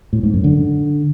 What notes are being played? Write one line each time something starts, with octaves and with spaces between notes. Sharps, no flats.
A2
G#2
F#2
D3